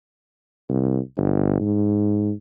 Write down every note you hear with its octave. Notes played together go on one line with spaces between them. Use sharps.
C2
G1
G#2